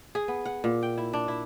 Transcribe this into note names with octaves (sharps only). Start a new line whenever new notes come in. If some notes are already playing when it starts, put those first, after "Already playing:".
G#4
B3
F#5
A#2
G5
E4
D4
E4